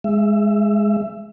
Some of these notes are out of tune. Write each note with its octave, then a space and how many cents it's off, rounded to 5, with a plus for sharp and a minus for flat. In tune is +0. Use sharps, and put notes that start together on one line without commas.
G#3 +0 E5 +20